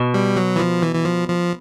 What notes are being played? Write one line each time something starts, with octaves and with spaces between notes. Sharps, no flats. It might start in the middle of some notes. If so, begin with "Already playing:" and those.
Already playing: B2
G3
F#3
E3
F3
E3
E3
F3
F3